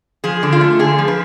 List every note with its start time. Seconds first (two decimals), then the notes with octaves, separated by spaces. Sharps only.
0.24 F3 G#4
0.43 D3
0.53 F4
0.61 A3
0.79 D3 G#4
0.99 F3
1.08 B4